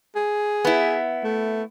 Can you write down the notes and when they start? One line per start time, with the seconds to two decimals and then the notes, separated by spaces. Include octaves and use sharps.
0.16 G#4
0.65 B3 E4
1.24 A3